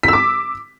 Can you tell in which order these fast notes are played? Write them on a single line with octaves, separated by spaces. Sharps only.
B6 E6 D6